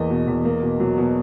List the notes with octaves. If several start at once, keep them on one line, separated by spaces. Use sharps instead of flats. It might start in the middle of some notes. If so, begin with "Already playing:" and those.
Already playing: E2 A#3 D#5
B2
E2
A#3
B2
F#3
B2